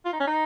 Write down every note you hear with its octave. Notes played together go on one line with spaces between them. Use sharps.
F4
D#4
C#4
D#4